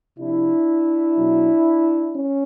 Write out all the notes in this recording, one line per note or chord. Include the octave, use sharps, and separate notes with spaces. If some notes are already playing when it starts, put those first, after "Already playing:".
C3 F3 D4 E4
B2 F#3
C#4